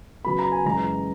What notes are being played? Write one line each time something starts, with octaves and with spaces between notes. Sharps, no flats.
C#3 F#3 B3 B5
A#5
G#5
F#2 C#3 E3 G#3 A#5